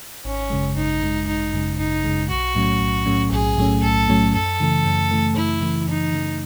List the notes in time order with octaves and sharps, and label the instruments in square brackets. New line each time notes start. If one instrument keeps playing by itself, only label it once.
[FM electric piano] G#1 [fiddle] C#4
[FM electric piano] F#2 C#3 G#3
[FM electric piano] G#1 [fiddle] D#4
[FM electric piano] F#2 C#3 G#3
[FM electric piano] G#1 [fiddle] D#4
[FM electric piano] F#2 C#3 G#3
[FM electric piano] G#1 [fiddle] D#4
[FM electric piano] F#2 C#3 G#3
[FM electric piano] B1 [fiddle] F#4
[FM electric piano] A2 F#3 A3 C#4
B1
A2 F#3 A3 C#4
[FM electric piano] B1 [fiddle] G#4
[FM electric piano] A2 F#3 A3 C#4
[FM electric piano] B1 [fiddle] A4
[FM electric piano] A2 F#3 A3 C#4
[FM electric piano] F#2 [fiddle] A4
[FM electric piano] C#3 E3 A3
F#2
C#3 E3 A3
[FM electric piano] F#2 [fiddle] E4
[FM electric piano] C#3 E3 A3
[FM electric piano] F#2 [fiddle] D#4
[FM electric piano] C#3 E3 A3